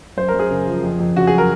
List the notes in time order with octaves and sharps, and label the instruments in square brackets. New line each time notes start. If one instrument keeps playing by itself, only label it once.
[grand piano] F#2 C5
A#4
F#2
G#4
C#3
F3
F2
F2
C#3 F#4
F#3 G#4
A#4